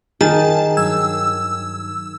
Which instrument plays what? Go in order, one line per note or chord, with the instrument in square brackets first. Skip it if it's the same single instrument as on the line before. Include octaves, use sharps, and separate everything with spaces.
[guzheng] D#3 [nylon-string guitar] G#4 [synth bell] A5
[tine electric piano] G2 F#3 G#6 [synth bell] E6